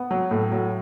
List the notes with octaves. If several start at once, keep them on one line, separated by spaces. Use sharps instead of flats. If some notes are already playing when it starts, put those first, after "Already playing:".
Already playing: B3
F#3
A2
F#3